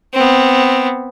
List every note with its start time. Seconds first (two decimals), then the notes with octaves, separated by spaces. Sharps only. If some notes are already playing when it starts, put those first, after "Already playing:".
0.14 B3 C4